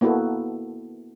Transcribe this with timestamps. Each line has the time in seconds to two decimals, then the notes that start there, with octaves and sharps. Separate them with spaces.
0.01 A#3 B3 E4 F#4 A4